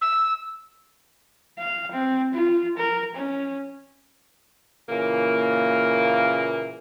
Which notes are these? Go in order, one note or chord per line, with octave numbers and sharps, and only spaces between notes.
E6
F5
C4
F4
A#4
C#4
A#2 C#3 E3 A#3